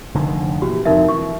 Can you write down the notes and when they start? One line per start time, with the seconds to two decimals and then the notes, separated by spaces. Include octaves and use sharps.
0.14 F1 D3 D#3
0.62 A#2 E3 F#4 G4
0.85 F2 C3 D#3 D#4 A#4 E5
1.09 E3 C#6